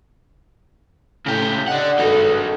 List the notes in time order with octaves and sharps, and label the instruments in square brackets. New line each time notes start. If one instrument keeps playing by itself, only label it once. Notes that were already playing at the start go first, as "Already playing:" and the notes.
[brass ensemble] A2 [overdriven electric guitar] C#3 G4
[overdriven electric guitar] D4 F#5 [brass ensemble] D5 D#5
[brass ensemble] G#1 G2 A4 [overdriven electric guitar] D#4 F#4